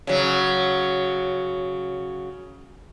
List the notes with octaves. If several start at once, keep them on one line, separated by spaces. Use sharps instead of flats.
C#3 F#3